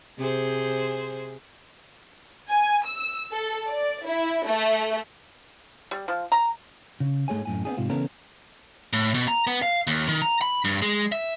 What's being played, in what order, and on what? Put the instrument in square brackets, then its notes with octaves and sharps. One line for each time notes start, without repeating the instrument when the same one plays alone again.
[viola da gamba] C3 G#4 C5
[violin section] G#5
E6
A4
D5
E4
A3
[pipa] G3
F3
A#5
[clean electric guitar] C#3
G#2 A3 G#4 C#5 G#5
F#2 A2 G#5
B3 C4 D4 G#4
G#2 C3 F4
C#3 E3 B3 C#4 A4 A#4
[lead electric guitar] A2
B2
A#5
B3
F5
D#2
D#3
A#5
B5
G2
G#3
E5